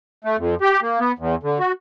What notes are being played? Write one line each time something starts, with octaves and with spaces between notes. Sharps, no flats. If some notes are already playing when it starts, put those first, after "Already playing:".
A3
F2
G4
A#3
B3
E2
D3
F#4